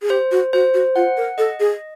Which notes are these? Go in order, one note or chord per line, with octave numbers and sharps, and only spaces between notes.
G#4
G4 C5
F#4
F#4 C5
F#4
F4 F#5
A#4
A4 D#5
G#4